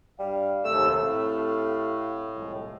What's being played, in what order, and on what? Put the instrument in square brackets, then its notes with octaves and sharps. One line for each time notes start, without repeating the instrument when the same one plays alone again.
[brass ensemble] G2 F5 [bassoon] G3
[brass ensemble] F#1 G#2 C3 [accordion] D#2 E6 [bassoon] A3
[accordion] A2 [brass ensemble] C4 G4 F5
[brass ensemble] C2 F3 G#3